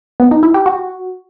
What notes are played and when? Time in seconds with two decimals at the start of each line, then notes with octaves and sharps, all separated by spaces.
0.20 B3
0.31 D#4
0.43 E4
0.54 G4
0.66 F#4